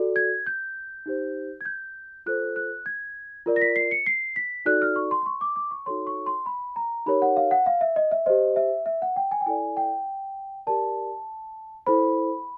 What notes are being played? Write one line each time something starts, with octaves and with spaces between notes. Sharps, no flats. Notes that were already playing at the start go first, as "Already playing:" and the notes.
Already playing: F#4 A4 D5
G#6
G6
D#4 G4 C5
G#6
G6
F4 A4 C5 F#6
F#6
G#6
F4 A#4 D5
A#6
B6
C7
C#7
C7
B6
D#4 F#4 A4 D5 F#6
F6
C#6
C6
C6
C#6
D6
D6
C#6
D#4 F#4 A4 C#5 C6
C#6
C6
B5
A#5
D#4 G4 A#4 C#5 B5
F#5
F5
F#5
F5
E5
D#5
E5
G4 C5 D#5
E5
E5
F#5
G5
G#5
G5
E4 A4 D5 G#5
G5
G4 A#4 D5 A5
E4 A4 C5 B5